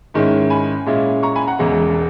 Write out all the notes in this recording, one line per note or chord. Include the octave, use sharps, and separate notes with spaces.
G#2 D#3 G#3 C#4 E4
G#5 B5
A#2 G#3 C#4 E4
A#5 C#6
G#5 B5
F#5 A#5
E1 E2 C#3 G#3